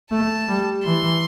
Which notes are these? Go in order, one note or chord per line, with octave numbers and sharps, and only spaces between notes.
A3 A5
G3
E3 C6